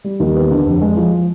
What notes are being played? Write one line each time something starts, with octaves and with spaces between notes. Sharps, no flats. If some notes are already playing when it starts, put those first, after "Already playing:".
G3
D#2
B3
D3
F1
G#3
F3